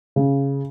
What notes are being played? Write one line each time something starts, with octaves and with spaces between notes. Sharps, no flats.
C#3